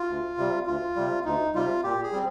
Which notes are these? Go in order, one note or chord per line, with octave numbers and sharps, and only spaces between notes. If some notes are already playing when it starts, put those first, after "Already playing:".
Already playing: F4
D2
C3 G3
D2 F4
C3 G3
D2 D#4
C3 G3 F4
A#2 G4
G#4
G3 C4